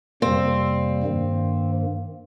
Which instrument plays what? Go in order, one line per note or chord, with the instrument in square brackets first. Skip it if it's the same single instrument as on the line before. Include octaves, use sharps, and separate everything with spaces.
[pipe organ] F2 C3 G3 A#3 [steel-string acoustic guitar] C4
[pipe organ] G2 D#3 A#3